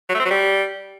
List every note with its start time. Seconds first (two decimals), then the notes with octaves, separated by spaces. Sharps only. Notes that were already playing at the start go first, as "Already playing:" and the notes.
0.09 F#3
0.14 A3
0.20 C4
0.25 F#3
0.30 G3